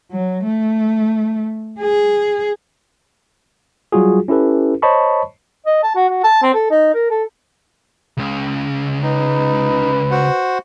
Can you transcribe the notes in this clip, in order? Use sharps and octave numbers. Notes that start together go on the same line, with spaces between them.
F#3
A3
G#4
F#3 G3 F4 F#4 G#4
C#4 E4 G4 A4 B4
C5 C#5 D#5 A5 B5 C#6
D#5
A5
F#4
F#4
A5
C4
A4
D#4
A#4
A4
C#2 C#3
D#4 B4
F#4 C5 F#5